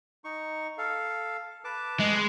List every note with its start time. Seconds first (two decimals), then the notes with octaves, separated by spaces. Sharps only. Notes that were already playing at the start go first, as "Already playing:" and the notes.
0.24 D#4 C#6
0.78 A4 F5
1.64 B4 A5 D6
2.00 G#3